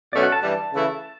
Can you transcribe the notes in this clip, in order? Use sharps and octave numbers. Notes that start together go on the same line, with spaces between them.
B2 F#3 A3 C#4 F#4 D5
F#5
A5
G2 E3 G3 A5
C#3 E3 A3 E4